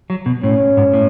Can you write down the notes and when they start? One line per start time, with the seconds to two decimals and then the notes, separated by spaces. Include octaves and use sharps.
0.10 F#3
0.26 B2
0.43 A2 C#4
0.77 G#2
0.93 A2